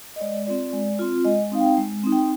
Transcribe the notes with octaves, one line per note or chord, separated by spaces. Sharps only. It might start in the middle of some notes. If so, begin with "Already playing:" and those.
D#5
G#3 D5
C4 F4 D5
G#3
C4 F4
G#3 D#5
C4 D#4 F5
G5
G#3
C4 D#4
G5